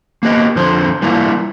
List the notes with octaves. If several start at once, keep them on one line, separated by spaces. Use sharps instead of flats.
A#3 B3 G4 D#5
F2 D3 F3 C5
E3 G3 A#3 E4 F4